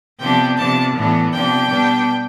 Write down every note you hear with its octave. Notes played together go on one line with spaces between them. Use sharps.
C3 F3 B3 D4 G5
C3 F3 B3 D4 A5
A2 E3 B3 D4
C3 F3 B3 D4 G5
B2 G3 B3 D4